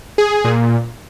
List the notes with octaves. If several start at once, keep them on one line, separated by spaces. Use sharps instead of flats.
G#4
A#2